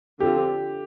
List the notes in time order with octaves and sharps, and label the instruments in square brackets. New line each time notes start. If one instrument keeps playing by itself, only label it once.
[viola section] D3 F3 C4 F4 A4 [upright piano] G4